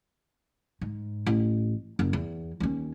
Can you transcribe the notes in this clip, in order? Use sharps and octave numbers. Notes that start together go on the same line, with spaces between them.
G#2
A1
F#1
E2
D#2 C#4